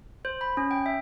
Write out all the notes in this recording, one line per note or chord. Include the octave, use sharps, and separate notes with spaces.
C5
B5
C#4
G5
E5